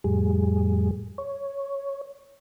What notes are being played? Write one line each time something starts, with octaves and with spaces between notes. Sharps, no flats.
F2 A2 G3 G#4
C#5